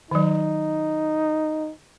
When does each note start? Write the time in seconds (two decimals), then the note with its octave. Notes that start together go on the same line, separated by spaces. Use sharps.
0.11 D#3 F#3 D#4